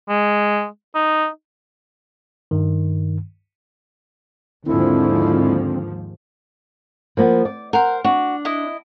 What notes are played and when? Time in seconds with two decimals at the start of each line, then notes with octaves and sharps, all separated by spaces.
0.09 G#3
0.95 D#4
2.51 G2 D#3
4.66 D#2 G#2 D3 F3 C4 E4
7.17 F3 A#3 B3
7.45 D5
7.73 A#4 C5 F#5
8.04 D4 F#4
8.45 E4 D#5